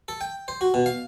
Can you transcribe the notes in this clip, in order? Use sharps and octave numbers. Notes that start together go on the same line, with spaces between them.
A4
G5
C5
F#4
B2
F5